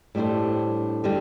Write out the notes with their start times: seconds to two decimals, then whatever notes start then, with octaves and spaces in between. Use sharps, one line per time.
0.15 A2 G3 D4 A4 C5
1.04 D3 G3